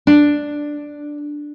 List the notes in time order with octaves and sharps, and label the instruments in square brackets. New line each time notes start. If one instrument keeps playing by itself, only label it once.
[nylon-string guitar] D4